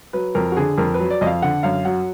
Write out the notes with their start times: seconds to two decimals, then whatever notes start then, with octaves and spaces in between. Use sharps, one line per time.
0.13 F#3 B4
0.35 F2 A#4
0.52 F#4
0.57 D3 G#4
0.78 F2 A#4
0.94 B4
1.00 F#3
1.10 D5
1.21 F2 D#5
1.27 F5
1.42 D3 F#5
1.63 F#2 F5
1.85 F#3 F#5